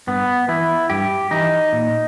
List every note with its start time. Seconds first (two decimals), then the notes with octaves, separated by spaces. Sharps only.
0.07 G2 B3
0.48 E3 E4
0.90 G2 G4
1.31 E3 D#4
1.73 A#2